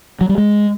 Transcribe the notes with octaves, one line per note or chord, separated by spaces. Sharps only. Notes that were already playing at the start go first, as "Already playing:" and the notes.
F#3
G3
G#3